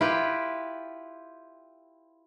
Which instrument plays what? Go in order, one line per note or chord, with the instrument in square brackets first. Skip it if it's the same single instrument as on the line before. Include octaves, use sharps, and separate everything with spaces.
[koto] E4 F4 G4 B4 G5